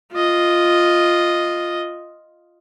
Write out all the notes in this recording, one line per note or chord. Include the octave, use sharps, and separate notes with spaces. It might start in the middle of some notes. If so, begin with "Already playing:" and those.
F4 D#5